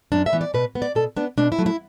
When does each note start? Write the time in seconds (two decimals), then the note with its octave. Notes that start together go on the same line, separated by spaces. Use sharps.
0.12 F#2 D4
0.26 E5
0.33 E3 B3
0.41 D5
0.54 B2 B4
0.75 B3
0.82 D5
0.95 B2 A4
1.16 B3 D4
1.38 B2 D4
1.52 E4
1.58 F#3 A3
1.66 E4